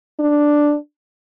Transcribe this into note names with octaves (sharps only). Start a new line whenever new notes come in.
D4